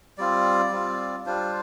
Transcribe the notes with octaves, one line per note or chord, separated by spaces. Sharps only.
G3 C4 F4 D5
G3 C4 F4
G3 D4 F4 C5